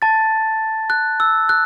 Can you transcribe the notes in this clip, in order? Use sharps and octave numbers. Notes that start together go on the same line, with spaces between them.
A5 A6
F#6
E6
F#6